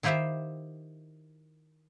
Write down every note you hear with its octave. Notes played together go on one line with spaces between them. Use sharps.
D#3 E4 F4 G4 C5 E5